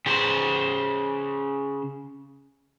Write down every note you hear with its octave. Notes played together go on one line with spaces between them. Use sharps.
C#3 C5